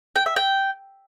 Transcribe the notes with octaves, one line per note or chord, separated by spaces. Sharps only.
G5
E5
G5